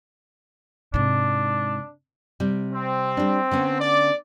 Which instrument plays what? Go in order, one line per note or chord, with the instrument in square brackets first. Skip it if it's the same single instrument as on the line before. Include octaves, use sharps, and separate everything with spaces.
[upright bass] G#2 C3 [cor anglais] D4
[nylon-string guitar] C3 G3
[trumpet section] C4
[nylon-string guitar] G3 D4
D3 B3 C#4
[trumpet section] D5